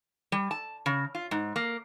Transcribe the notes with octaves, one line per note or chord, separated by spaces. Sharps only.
G3
A5
C#3
F4
G#2
A#3